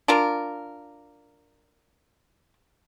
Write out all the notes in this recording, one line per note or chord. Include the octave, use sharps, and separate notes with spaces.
D4 F4 A#4